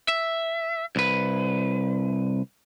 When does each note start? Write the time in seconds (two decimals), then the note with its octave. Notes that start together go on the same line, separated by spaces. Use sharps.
0.08 E5
0.96 C2 B4